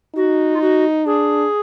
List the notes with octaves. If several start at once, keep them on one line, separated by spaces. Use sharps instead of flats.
D#4 F#4
F4
F#4
D4 G#4